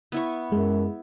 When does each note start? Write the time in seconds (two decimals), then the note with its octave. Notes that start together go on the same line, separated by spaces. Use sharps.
0.12 B3 E4 C#6
0.52 F#2 G#3